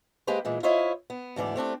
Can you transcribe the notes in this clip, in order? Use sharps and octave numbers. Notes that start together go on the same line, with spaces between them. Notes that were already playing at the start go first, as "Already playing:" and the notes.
G#3 A#3 G4 B4 C5
A#2 E3 G#3
E4 F4 C5 C#5 D#5 E5
B3
D2 G#2 E3 D5
A3 C4 D4 G4